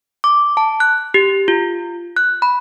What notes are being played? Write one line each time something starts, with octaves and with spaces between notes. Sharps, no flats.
D6
A5
F#6
G4
F4
F#6
B5